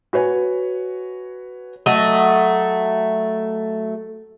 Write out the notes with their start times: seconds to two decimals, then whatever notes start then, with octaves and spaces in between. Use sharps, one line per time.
0.13 F#4 B4 C#5 G#5
1.86 F#3 A3 D#5